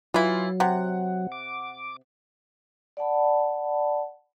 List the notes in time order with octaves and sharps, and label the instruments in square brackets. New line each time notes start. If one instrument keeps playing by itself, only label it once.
[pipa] E3 E4 [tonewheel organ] F#3 [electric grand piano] F4
[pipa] C3 [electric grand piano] F#5
[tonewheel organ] D6
[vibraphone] D5 F#5 A5 B5